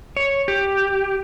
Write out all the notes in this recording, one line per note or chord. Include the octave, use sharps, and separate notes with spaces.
C#5
G4